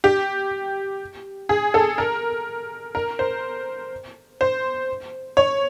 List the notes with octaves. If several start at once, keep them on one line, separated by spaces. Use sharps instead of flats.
G4
G#4
A4
A#4
A#4
C5
C5
C#5